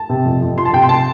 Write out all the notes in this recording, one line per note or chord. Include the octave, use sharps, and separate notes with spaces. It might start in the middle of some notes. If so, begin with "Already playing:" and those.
Already playing: A5
C3
F2
F2
F3 C6
A5
C3 G5
C6
A5